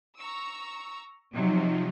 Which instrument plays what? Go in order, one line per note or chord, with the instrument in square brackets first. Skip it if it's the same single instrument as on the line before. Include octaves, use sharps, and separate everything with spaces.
[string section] A#5 C#6 E6
[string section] C3 F#3 [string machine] F3 D#4